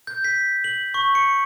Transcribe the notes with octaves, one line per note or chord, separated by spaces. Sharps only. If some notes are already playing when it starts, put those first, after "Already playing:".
G6
B6
F#7
C#6
C#7